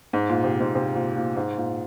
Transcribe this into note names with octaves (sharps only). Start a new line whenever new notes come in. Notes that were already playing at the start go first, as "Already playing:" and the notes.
G#2
A#2
C3
G#2
C3
A#2
A#2
G#2
A#2